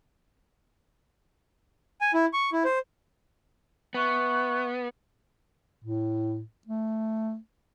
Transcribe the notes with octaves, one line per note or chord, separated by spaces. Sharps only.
G#5
E4
C#6
E4
C5
B3 E5 C#6 F#6
A2
A3